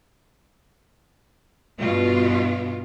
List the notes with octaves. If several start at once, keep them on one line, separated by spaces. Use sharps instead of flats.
G2 B2 B3 F4